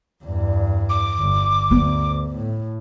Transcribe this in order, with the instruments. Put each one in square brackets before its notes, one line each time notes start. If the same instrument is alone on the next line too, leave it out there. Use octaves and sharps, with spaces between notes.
[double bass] E2 G2
[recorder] D6
[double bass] G1
[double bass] D2 [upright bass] B3
[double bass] A2